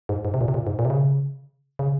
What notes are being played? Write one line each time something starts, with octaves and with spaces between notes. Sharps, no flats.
G#2
G#2
C3
A#2
C3
A#2
G#2
A#2
C3
C#3
C#3